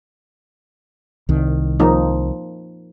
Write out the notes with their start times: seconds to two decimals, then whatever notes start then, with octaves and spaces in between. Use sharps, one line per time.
1.29 C2 D#3
1.80 F3 A#3 D#4